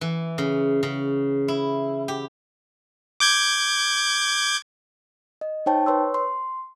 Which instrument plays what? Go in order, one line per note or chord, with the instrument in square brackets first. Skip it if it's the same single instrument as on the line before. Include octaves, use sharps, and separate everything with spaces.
[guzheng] E3
C#3
C#3
E4
G4
[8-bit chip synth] D6 G6 G#6
[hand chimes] D#5
D#4 C5 C#5 G5 A5
B4 C#5 C6 E6
C6